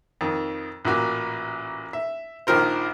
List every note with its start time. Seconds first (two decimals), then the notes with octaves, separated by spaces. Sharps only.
0.21 F2 D#3
0.85 A1 A#2 F#4
1.93 E5
2.47 A#1 D#3 F3 A#4 C5